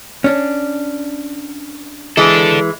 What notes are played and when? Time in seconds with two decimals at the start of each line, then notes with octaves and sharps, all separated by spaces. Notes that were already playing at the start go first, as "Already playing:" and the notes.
0.24 C#4 D4
2.17 E3 G#3 A4 D5